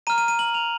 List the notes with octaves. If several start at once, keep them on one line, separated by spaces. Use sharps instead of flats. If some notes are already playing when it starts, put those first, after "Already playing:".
A#5 F6 D#7
D#7
D#7
F#7
F7